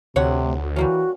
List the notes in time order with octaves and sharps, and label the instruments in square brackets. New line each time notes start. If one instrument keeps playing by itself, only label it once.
[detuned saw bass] D2 [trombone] C3 [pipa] C#5 F#5
[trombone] E3 [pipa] G3 A#3 C#4 [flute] F#4